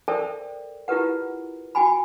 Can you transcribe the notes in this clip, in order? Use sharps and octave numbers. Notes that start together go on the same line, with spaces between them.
A4 A#4 C5 D5 E5 G5
E4 F4 G4 A#4 B4 F#5
F#4 G5 G#5 B5